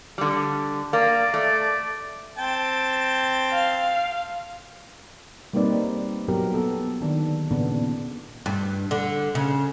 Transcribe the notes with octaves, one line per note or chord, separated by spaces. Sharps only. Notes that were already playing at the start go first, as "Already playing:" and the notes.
D3 G3
A#3 D5
A3 D5
C4 G5 A5
F5
G3 A#3 C4 D#4 B4 D5
F#3 B3 G4 A#4
B3 A4
D3 D#3 D4
A#2 C#3 B3 D4
G2
D3
C#3